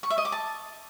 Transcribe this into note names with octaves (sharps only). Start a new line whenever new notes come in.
C#6
E5
D#5
D6
A5